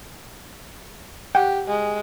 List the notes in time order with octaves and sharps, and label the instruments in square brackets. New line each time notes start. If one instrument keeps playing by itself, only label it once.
[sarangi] G4 [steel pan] F#5 G5
[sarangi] G#3